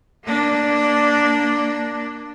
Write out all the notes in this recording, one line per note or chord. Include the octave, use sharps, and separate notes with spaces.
A#3 D4